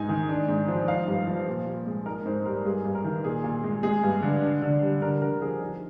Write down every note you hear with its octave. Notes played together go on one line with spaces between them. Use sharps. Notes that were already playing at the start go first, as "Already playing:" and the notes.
Already playing: G#2 D#4 G#5
D#3
D4
G#2
F3
D#4 F5
G2
F3
A#2
A#2
G#3
D#4 A#4
G#2 C5
G3 A#4
G2 G#4
G2
A#4
D#3
A#2 G#4
A#2
G#3
G#3 G#4
G2
D3
D4
D3
G3
D3 A#4
D3 A#4
F3 G#4
D#4